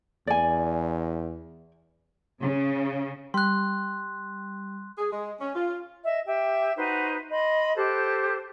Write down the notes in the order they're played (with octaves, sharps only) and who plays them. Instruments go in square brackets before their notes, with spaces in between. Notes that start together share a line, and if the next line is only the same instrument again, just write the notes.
[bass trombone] E2 [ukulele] D5 G#5
[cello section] C#3
[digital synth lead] G3 [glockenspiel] C6 F#6
[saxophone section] G#4
G#3
C#4
F4
[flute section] D#5 E5
G4 E5 G5
D#4 F#4 B4 C5
D#5 B5 C6
G4 A4 C5 F#6